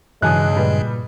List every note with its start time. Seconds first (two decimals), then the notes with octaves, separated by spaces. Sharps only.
0.22 B1 G2 C#3 E3 G#3 G#5 D#6 F#6
0.56 A#2 G3 B4